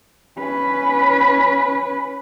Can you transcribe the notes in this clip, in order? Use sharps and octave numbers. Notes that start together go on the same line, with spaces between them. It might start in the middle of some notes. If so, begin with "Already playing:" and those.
C#4 B4